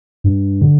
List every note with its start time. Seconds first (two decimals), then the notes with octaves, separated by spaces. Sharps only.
0.24 G2
0.62 D3